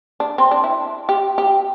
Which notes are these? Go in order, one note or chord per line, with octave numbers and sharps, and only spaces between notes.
D4
C4
D4
E4
G4
G4